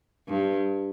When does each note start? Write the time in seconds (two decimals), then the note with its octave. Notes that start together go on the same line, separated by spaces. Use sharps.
0.28 G2